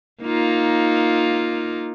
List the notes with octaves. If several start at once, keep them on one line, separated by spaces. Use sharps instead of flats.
A#3 D#4 F4